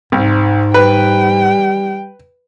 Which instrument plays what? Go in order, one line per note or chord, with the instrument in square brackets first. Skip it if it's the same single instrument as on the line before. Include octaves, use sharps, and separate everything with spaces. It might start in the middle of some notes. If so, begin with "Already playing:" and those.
[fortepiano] C2 [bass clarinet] G#2
[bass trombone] G3 [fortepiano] B4 [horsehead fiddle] G5